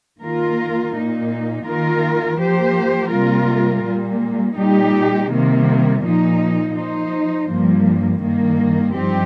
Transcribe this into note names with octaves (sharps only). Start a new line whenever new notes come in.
D#3 A#3 F4 A#4
A#2 A#3 D#4
D#3 A#3 F4 A#4
F3 A#3 G4 C5
C3 G3 A#3 F4 A#4
A#2 G3 A#3
A#2 G3 D#4 G4
C3 D#3 G3 A#3
A#2 F3 A#3 D#4
F3 D#4 C5
G2 F3 A#3
G2 D#3 A#3
G2 F3 C4 D#4 G4